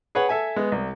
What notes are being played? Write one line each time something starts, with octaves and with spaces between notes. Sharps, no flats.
G#4 B4 C#5 F#5
A4 E5 G#5
G#3 B3
C2